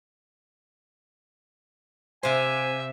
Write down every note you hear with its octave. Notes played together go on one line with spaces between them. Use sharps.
C3 C5 E5 F5 G#5